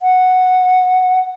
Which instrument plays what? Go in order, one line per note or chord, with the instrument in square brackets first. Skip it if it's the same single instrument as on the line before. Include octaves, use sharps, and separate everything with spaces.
[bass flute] F#5